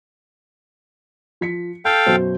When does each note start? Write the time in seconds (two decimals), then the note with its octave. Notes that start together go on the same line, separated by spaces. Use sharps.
1.41 F3 B6 C#7
1.85 A4 F5 G5 G6
2.06 F#2 B2 C5